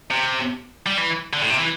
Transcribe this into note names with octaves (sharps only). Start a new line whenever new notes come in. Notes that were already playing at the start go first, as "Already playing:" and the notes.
C3
G3
E3
D3
A2
C3
E3